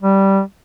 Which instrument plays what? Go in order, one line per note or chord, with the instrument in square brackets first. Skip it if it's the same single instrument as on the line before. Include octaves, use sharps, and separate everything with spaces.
[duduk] G3